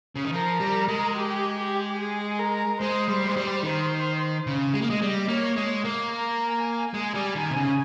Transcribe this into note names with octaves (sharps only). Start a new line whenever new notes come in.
C#3
D#3
F3 A#4
G3
G#3
G4
G4
G#4
A#4
G#3 C5
G3
G#3
G3
D#3 C5
C#3
G#3
A#3
G#3 D#5
G3
A#3 C#5
G#3
A#3
A#5
G#5
G#3
G3
D#3
C3
C#3